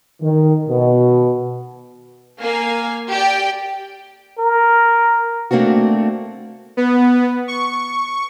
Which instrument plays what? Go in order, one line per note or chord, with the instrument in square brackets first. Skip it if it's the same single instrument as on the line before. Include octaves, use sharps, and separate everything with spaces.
[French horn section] D#3
B2
[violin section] A#3 F5 G#5
G4 D5 G5
[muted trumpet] A#4
[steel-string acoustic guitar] A3 A#3 C4 D4 F#4
[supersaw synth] B3
C#6